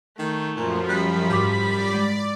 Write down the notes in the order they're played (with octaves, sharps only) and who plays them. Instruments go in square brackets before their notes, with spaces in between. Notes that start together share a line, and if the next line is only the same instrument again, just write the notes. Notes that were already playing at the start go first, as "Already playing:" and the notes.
[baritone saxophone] D#3 [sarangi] A3
[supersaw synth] F#2 F3 [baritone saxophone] A#2
[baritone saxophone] G3 [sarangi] B5 [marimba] F#6
[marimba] G#2 D6 [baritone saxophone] G3
[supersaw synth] D5
[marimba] G#3